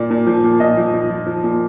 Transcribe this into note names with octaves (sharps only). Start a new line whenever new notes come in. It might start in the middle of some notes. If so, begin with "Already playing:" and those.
Already playing: A#2 D5
A#2
F3
A#2
A#2 D#5
F3
F3
F3
F3
A#2